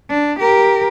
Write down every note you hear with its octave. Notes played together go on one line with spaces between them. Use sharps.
D4
G4 A#4